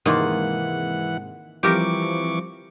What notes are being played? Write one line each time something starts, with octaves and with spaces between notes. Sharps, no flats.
G#2 C3 D#3 E3 G#3 A#3 F4 F#5
E3 F3 G3 C4 G4 A#4 C#6 D6